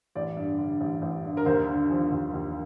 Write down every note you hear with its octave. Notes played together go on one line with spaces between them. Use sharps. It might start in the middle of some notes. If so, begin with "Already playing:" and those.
A1 D5
G2
D3
A1
A1
G2
A#4
D#2 C5
D3
F3
D#2
D#2